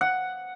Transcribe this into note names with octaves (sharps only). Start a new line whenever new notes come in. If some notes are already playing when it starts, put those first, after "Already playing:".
F#5